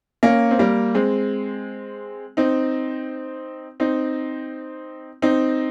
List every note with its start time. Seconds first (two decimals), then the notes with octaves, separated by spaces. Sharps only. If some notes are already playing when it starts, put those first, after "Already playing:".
0.23 A#3 C#4
0.51 C4
0.59 G3 A#3
0.95 G#3 C4
2.37 C4 D#4
3.80 C4 D#4
5.22 C4 D#4